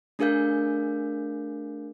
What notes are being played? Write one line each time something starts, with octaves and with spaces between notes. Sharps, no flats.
A3 D4 G#4 A#4 F5 G6